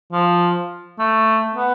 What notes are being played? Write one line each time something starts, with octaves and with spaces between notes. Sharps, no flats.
F3
A3
B3